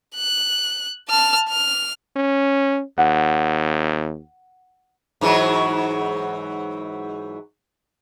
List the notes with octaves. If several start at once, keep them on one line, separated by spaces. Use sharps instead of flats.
F#6
A5 F6
F6
C#4
D#2 F#5
G#2 E3 F#3